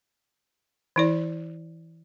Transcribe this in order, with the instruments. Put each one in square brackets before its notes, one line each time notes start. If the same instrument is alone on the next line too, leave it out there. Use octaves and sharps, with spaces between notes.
[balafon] E3 E4 D5